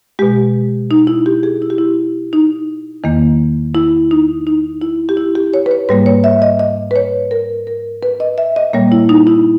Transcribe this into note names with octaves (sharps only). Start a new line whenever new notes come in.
B2 G#3 G4
D#4
E4
G4
G#4
E4
G4
E4
D#4
E2 D#3 A#3
E4
D#4
D#4
E4
G4
E4
G4
C#5
B4
C#5
G#2 G3 A#3 B4
C#5
E5
D#5
D#5
B4
C#5
A#4
A#4
B4
D#5
E5
D#5
A#2 G3 A#3 C#5
E4
D#4
E4